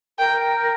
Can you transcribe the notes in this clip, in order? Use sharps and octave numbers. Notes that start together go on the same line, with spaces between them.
A#4 G5